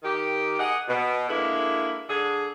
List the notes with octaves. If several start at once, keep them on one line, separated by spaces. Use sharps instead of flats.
D#3 G4
G#4 D#5 F#5
B2
D3 G#3 A#3 E4
D3 G#4